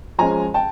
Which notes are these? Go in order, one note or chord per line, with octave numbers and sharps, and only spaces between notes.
F3 G#3 C#4 G#5 A#5
G5 A5